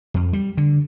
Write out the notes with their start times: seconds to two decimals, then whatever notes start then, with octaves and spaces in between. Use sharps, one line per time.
0.14 F2
0.33 G3
0.57 D3